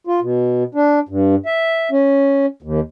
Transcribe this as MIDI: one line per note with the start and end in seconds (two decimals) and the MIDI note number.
0.07 0.20 65
0.22 0.63 47
0.75 0.99 62
1.09 1.35 43
1.46 1.89 76
1.91 2.46 61
2.62 2.80 39